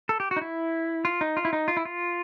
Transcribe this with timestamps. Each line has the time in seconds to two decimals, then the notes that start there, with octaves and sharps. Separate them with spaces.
0.09 A4
0.20 G4
0.31 F#4
0.36 D#4
0.41 E4
1.05 F4
1.21 D#4
1.37 F4
1.45 E4
1.53 D#4
1.68 F4
1.77 E4
1.85 F4